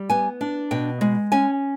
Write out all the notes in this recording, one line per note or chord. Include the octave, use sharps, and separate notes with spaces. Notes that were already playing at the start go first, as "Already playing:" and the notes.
Already playing: G3
B3 G#5
D4
B2 G5
G#3
C#4 G#5